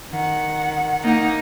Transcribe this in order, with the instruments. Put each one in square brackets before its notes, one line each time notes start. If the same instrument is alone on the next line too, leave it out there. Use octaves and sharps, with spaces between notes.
[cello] D#3 F#5
[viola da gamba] A#3 D#4